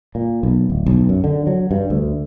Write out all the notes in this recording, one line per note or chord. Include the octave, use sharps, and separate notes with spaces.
A#2
B1
D1
B1
F#2
D3
F#3
G2
D2